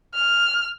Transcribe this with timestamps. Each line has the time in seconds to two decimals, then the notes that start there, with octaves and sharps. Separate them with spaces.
0.14 F6